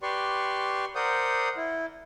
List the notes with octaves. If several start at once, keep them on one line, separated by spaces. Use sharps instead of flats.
G4 B4 D5 C6 C#6
A#4 C5 D5 F#5 D#6 G6
E4